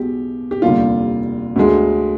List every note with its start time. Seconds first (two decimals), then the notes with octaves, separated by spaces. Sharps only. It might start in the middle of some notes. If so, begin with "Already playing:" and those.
Already playing: B1 B2 G#3 G4
0.51 G4
0.62 F1 D#2 D3 G3 F4
1.56 D2 D3 G#3